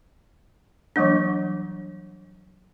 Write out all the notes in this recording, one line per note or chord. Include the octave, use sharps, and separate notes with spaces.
E3 F#3 G3 A#3 D4